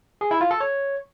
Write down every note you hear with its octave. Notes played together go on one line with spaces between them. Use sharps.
G#4
E4
F4
A4
C#5